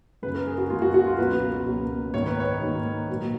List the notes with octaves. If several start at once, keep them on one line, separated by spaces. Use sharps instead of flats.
F#2 C#3 G#3 B4
A#4
G#4
F#4
F#2 C#3 G#3 F4
F#4
F#4
F4
A#4
C#2 B2 F#3 A#3 B4
C#2 B2 F#3 A#3
G#2 D#3 A#3 C#5
B4
C#5
G#2 D#3 A#3
A#2 F#3 A#3